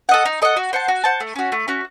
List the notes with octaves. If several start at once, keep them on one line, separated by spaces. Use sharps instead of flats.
A4 D#5 F#5
D#4
A4 D#5 F#5
F#4
C5 F#5 A5
F#4
C5 F#5 A5
A3
C#4 F#4
A3
C#4 F#4